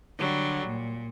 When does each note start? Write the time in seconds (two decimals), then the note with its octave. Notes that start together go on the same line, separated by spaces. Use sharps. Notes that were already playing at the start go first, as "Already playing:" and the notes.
0.19 D3 F#3 G3
0.67 A#2